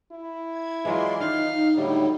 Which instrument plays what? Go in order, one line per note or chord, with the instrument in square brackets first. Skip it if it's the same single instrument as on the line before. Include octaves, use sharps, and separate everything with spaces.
[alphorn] E4
[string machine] G#6
[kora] E3 F#3 F4 [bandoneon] G#3 [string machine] D5 C6
[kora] D#3 [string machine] D#4 [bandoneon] F5 F6
[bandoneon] A2 D3 G3 [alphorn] F#3